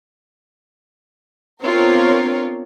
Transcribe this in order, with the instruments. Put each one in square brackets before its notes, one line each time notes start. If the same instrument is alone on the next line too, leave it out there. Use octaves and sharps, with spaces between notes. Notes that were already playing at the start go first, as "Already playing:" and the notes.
[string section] B3 C4 D4 F4 A#4 C#5